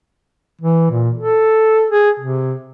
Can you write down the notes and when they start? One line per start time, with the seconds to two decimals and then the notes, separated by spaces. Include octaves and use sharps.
0.61 E3
0.90 A#2
1.18 A4
1.90 G#4
2.19 C3